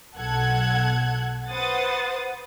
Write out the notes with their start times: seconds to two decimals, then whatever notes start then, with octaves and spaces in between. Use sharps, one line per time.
0.17 B1 A4 F#5 F#6 G#6
1.50 B4 C5 F#5 D#6 A6